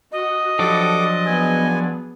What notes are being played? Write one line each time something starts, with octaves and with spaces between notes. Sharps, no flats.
F#4 D#5
F3 F#3 D4 G4 A4 D6
B3 G#4 B4 G#5